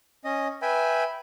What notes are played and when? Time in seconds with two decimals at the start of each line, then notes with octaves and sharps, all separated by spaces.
0.25 C#4 D#5
0.62 B4 E5 G5 G#5 B5